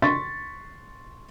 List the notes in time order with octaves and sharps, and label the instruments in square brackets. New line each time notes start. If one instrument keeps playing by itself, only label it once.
[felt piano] C6 C#6 A6 B6